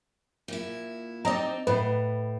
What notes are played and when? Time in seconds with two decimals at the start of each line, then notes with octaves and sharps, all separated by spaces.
0.48 A#2 E4
1.25 C4 D#4 D5 D#5 A#5
1.67 A2 B4